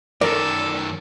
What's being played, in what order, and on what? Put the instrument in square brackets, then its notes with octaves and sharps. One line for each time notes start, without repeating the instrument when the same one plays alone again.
[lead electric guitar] F#2 D#3 [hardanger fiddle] A4 [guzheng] A#4 [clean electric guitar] D5